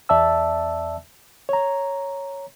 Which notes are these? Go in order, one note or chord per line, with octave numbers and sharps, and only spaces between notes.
E2 D5 E5 A5 E6
C#5 A#5